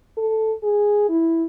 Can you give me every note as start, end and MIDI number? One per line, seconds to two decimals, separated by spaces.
0.17 0.53 69
0.63 1.04 68
1.09 1.46 64